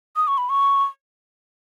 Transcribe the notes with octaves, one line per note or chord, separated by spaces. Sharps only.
D#6
C#6
B5
C#6